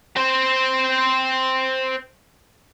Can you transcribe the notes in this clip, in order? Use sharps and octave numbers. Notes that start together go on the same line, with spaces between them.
C4 C5